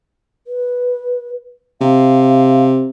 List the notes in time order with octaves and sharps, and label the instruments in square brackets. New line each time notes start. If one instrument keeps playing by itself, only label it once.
[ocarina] B4
[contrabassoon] C3 [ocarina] F5